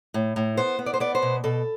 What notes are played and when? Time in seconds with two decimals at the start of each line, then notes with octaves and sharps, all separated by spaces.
0.14 A2
0.36 A2
0.57 B3 C5
0.79 B3
0.86 D5
0.94 C5
1.00 B3 D5
1.15 C5
1.22 B2
1.44 B2 A4